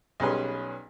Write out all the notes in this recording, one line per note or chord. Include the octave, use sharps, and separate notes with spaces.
B1 G3 C#4 G#4 B4 C6